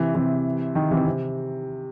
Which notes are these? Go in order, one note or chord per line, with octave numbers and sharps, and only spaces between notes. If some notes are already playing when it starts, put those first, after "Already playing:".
Already playing: C3 E3
C3 E3
D#3
C3 E3
C3